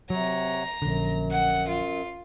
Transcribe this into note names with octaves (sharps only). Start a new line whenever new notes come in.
C3 F#3 C#5 F#5 A#5
A#1 F#2 D3
F#5
F4